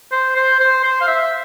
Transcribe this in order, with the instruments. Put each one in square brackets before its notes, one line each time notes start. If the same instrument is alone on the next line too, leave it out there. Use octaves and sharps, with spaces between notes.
[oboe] C5
C5
C5
C5
F5
E5